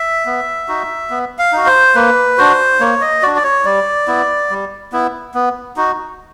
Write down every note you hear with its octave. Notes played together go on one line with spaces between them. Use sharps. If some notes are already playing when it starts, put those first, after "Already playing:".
Already playing: E5
B3
D#4 F#4
B3
F5
D#4 F#4
C5
A#3 B4
D4 F#4 C5
A#3 C#5
D#5
D4 F#4 D5
D5
C#5
G3 D5
B3 E4
G3
B3 E4
B3
D#4 F#4